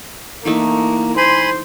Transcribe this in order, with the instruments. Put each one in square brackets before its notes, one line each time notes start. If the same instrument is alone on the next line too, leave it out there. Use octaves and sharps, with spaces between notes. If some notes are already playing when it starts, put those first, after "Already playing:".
[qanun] E3 A3 D#4 [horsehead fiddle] A#3
[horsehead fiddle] C5 [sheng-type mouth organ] G#5 B5 C6